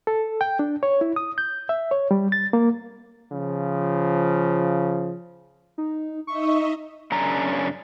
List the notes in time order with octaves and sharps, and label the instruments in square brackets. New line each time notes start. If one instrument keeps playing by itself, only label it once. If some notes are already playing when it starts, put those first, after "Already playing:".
[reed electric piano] A4
G5
D4
C#5
E4
D#6
G6
E5
C#5
G3
A6
A#3
[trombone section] C#3 F3
[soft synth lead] D#4
[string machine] D#4 D#5 E5 [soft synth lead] C#6
[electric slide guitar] F#2 C#3 C#4 D4 A#5